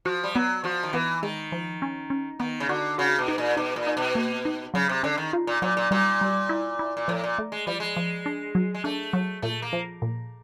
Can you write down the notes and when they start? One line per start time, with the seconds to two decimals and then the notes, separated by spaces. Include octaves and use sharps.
0.05 F3 F#4
0.24 G3
0.35 F#3 B3
0.64 F3 F#4
0.83 D#3
0.93 E3 B3
1.23 D#3 G#3
1.52 F3
1.82 C#4
2.10 C#4
2.39 D#3 B3
2.60 C#3
2.69 D3 F#4
2.98 C#3 F#4
3.19 B2
3.28 D#4
3.38 A#2
3.57 B2 D#4
3.76 A#2
3.87 D#4
3.97 B2
4.15 A#3
4.45 D#4
4.74 C#3 F#3
4.89 C3
5.03 D3 C#4
5.18 D#3
5.33 F4
5.47 A#2
5.62 A#2 F#3
5.77 A#2
5.91 A#2 G3
6.21 G3
6.49 E4
6.79 E4
6.97 A#2
7.08 A2 F3
7.24 A#2
7.38 A3
7.52 G#3
7.67 F3 G3
7.80 G#3
7.97 F3
8.26 D4
8.55 F#3
8.75 G#3
8.84 A3 D4
9.13 F#3
9.42 A#2 A3
9.62 A#3
9.73 F3
10.02 A#2